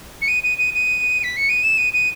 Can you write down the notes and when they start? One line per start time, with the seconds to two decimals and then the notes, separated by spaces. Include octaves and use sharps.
0.22 C#7
0.28 D#7
0.43 D#7
0.58 D#7
0.74 D#7
1.24 B6
1.37 C#7
1.49 D#7
1.63 E7
1.78 D#7
1.93 D#7